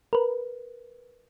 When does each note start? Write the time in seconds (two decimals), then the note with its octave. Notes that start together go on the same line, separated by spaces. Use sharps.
0.13 A#4 B4